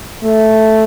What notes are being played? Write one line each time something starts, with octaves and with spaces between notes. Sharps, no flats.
A3